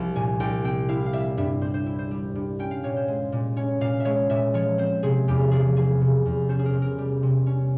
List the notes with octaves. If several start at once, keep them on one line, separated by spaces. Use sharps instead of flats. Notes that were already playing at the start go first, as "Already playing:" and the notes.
Already playing: C2 F3 F5
A#2 G#5
C2 G5
C4 G5
E4 F5
F5
G3 E5
G2 E5
C4 C5
C5
E4
C5
G3
G2
C#4 G5
F5
A#2 C#5
C5
G#3
A#2
C#4 C#5
A#2 F5
E5
G#3 C#5
A#2 E5
F3 C#5
C4 C5
C3 G#4
E2 G4
F3 G#4
C4 G#4
C3
E2
C#4 C5
G#4
A#4
C3
A#4
G3
C3
C#4